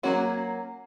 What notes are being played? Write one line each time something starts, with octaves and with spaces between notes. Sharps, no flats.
F#3 A#3 C#4 F#4